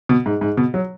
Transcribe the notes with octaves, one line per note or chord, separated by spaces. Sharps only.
B2
G#2
G#2
B2
F#3